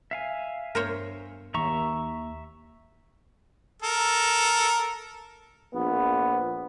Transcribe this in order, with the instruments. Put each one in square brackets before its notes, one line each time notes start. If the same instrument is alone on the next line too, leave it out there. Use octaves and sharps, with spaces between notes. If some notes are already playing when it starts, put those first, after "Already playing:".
[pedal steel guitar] E5 F5 G#5
[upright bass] G2 B3 [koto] A#4 C5 C#5
[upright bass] D#2 [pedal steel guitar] E5 A#5 C#6
[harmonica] A4 A#4
[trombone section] A#1 B3